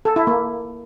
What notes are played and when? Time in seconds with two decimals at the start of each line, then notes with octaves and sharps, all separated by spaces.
0.05 A4
0.16 E4
0.27 A#3